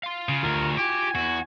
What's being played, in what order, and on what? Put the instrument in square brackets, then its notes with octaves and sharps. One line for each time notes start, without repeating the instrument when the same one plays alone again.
[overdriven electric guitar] F5 C6
[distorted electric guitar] C#3
[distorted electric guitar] D2 [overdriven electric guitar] F4 F#4 [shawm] A#4
[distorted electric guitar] G4 [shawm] G#5
[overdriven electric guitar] E2 [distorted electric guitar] F#4